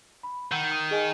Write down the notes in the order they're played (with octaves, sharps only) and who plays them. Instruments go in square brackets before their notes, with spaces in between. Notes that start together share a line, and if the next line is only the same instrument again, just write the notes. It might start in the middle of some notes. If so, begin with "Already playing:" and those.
[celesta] B5
[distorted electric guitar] D#3 [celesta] F#5 E6 G6
[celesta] A#5 D#6 D#7
G#4 D#5 G#5